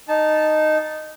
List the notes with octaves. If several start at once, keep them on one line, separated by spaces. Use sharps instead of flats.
D#4 A5